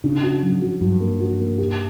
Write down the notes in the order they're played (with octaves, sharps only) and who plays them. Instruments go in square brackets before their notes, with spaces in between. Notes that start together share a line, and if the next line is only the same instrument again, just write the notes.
[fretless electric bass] C#3 [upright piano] D4
[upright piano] F#4
F#3
F#4
[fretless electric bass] G2 [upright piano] F#3
[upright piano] A#3
F#4
A#3
G4